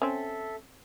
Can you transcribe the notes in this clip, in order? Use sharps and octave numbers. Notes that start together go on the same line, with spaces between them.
C4 C#4 A4 E5